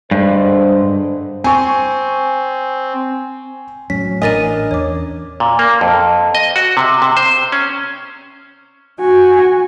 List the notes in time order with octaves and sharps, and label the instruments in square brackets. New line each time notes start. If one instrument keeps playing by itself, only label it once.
[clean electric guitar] G2 [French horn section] D3 G#3 C5
[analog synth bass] C4 [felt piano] G#5 C#6
[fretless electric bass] A2 F#3 [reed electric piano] C#4 [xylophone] B6
[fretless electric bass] A1 [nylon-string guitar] D4 A#4 D#5 [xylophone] G#5 A6 D#7
[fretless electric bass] E2 [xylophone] C#5 D6
[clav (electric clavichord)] A#2
A#3
F2
D#5
F#4
C3
C3
C5
C#4
[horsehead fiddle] F#4 G#5